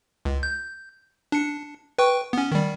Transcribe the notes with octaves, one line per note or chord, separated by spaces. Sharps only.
C#2
G6
D4 C#7
B4 G5 C#6
B3 C#4
D#3 G3